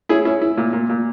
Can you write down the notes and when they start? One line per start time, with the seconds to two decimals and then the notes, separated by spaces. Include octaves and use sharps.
0.09 C#4 E4 G#4
0.25 C#4 E4
0.42 E4
0.57 A#2
0.73 A#2
0.89 A#2